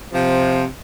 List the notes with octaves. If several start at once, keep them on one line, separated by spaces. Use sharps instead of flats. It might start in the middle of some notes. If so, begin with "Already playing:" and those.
C3 F3